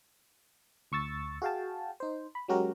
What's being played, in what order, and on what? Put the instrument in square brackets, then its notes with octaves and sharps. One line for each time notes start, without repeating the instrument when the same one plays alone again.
[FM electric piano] D2 C#6 E6 A6
F#4 G#4 F5 G5 A5
D#4 C5
B5
F#3 G#3 C#4 F#4 G4 A#4